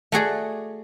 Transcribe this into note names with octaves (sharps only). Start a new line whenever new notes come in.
A3 F#4 G#4 D5